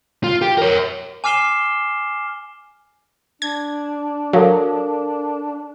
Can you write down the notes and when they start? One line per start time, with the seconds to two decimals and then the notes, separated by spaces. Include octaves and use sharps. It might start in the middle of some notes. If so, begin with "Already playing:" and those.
0.24 F4
0.42 G4
0.58 A#4 C#5
1.24 G#5 D6 F6 C7 E7 G7
3.42 D4 G#6
4.33 F#3 A4 A#4 F5